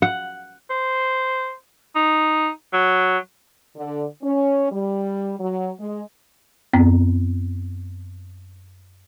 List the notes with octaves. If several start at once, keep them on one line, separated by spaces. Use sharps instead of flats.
F#5
C5
D#4
F#3
D3
C#4
G3
F#3
G#3
F#2 B3 C4